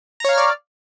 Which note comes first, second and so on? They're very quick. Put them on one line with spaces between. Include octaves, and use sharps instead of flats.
A#5 C#5 F5 F6 D5